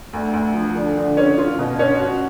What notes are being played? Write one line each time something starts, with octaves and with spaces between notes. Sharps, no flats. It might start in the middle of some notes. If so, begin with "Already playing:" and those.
D2
D2
F3
D3
D3
C#4
F4
B2
C#4
F#4